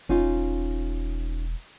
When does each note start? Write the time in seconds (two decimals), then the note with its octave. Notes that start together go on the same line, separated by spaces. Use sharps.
0.09 E1 C#4 D#4 F4